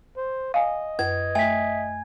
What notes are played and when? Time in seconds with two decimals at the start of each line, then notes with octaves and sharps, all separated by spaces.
0.17 C5
0.54 D#5 F5 G#5
0.99 F#2 B4 G#6
1.35 A3 E5 G#5 B6